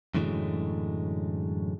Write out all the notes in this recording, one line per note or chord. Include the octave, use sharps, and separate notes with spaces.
F#2 A2 D3 E3 F#3 G#3